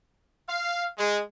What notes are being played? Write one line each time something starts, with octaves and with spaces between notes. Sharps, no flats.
F5
G#3